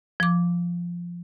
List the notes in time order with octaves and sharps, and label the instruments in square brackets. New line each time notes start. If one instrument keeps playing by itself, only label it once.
[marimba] F3 D6